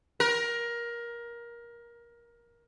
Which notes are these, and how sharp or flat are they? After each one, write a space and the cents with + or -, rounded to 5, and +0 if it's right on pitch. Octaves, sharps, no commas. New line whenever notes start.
A#4 +20